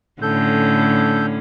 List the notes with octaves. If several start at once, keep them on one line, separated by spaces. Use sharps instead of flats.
A2 D3 C#4 A4 G6